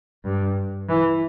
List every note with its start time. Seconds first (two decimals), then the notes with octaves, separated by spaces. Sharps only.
0.24 G2
0.90 E3